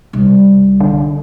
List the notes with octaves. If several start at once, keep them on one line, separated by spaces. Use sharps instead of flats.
C2
D3